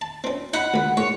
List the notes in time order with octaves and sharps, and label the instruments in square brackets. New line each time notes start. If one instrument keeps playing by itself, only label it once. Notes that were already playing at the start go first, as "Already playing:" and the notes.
[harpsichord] A5
C4 C#4
[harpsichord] D#4 B5 [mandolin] F#5
[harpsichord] C#2 B5
[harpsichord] G#2 [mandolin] C#5